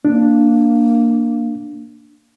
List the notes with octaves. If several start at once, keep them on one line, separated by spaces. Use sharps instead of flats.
A#3 D4